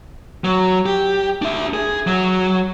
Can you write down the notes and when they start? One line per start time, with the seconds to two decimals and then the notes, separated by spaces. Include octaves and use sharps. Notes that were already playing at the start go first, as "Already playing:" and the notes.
0.44 F#3
0.86 G4
1.42 D4 E5
1.73 G#4
2.07 F#3